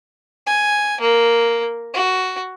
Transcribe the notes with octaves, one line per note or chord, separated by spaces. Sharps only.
G#5
A#3
F#4